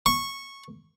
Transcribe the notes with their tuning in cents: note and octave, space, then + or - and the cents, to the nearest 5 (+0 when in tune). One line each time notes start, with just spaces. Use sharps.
C#6 -10